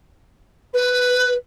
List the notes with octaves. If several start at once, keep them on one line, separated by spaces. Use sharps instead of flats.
B4